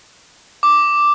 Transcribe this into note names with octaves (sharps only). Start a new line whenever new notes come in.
D6